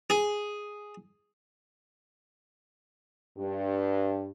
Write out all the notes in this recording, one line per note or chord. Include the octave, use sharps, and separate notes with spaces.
G#4
G2